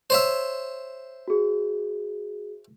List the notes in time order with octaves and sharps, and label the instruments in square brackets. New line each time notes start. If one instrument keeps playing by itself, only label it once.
[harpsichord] C5 C#5 E5
[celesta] F#4 G#4